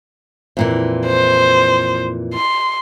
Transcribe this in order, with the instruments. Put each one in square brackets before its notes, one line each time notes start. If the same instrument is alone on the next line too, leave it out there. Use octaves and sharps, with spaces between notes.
[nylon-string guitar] F2 A#2 E3
[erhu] C5
C6